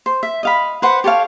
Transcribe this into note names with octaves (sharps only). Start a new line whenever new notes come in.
C5
E5
D#5 F5 B5
B4 C5 F#5
G4 A4 C#5 F5